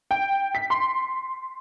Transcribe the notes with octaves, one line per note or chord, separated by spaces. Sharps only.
G5
B6
C6